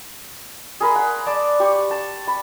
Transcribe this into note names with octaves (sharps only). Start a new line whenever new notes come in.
G#4 A#4 B5 C6
F#5
D5 A5 D6
G4 C#6
A5
B5